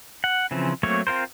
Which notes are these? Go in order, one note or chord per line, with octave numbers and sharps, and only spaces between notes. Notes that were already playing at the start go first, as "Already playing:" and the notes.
F#5
C#3 E3 F3 C4
F#3 A3 A#3 C4 C#5
C4 F4 A#4 C5